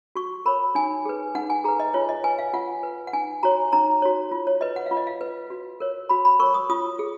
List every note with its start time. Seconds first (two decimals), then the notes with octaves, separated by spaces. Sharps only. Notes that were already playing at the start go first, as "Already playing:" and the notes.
0.15 F#4 C#6
0.46 A#4 C#5 B5
0.75 D#4 G#5
1.05 G#4 B4
1.35 D#4 F#5
1.50 G#5
1.64 G#4 B4 A#5
1.80 D#5
1.94 F4 C#5
2.09 D#5
2.24 B4 G#5
2.39 F5
2.54 F4 F#5
2.83 B4
3.07 F#5
3.13 D#4 G#5
3.43 F#4 C#5 A#5
3.73 D#4 A#5
4.02 F#4 C#5
4.31 F4
4.47 C#5
4.61 B4 D#5
4.76 F#5
4.86 F4 F5
4.97 D#5
5.07 F5
5.21 B4
5.50 F#4
5.80 A#4 C#5
6.09 F#4 B5
6.25 B5
6.40 A#4 C#5 C#6
6.54 D#6
6.70 F4 D#6
6.99 G#4